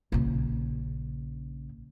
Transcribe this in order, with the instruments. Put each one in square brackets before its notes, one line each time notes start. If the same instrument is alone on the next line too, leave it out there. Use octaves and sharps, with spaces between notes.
[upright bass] A#1 C#3